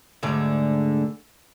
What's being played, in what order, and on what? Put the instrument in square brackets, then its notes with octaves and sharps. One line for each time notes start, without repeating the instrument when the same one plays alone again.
[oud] D2 G#2 D3